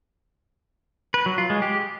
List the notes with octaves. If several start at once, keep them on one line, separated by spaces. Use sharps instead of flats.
B4
F#3
F4
G#3
G4